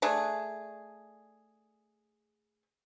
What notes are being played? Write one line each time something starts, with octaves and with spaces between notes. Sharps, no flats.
A3 D4 G#4